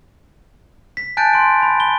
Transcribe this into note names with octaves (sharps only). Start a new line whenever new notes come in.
B6
G#5 A5 F#6 G6 A6 D7
C6 D7
B5
G7